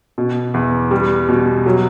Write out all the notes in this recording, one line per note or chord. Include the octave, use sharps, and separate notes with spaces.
B2
E2
G3
B2
F#3